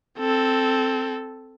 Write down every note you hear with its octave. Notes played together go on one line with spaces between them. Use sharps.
C4 A4